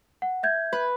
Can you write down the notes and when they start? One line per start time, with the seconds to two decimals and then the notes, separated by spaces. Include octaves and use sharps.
0.22 F#5
0.43 E5 G6 G#6
0.73 B4